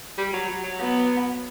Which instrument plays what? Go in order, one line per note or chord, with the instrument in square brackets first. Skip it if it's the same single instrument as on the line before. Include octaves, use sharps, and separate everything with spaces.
[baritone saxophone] G3
F#3
F#3
F#3
[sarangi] B3